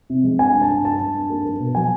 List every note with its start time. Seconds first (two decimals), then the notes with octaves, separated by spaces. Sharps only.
0.10 C3
0.24 G#3
0.39 G2 G#5
0.54 G2
0.62 A5
0.69 G2
0.85 G2 A5
0.99 G2
1.15 G2
1.30 A#3
1.45 A#3
1.60 B2
1.75 F#3 G#5